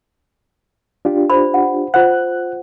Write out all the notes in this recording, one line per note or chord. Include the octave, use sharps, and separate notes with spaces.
D4 F4 G4
C5 D5 B5
F#5
F4 C5 F#5 F#6